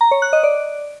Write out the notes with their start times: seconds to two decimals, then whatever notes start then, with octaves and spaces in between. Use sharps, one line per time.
0.01 A#5
0.11 C#5
0.22 F#6
0.33 D#5
0.43 D5